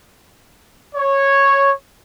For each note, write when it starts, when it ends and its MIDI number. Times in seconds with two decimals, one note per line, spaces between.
0.94 1.71 73